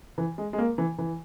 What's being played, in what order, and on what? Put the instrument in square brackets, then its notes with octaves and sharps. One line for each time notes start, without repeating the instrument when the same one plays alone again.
[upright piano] E3
G#3
G#3
A#3
E3
E3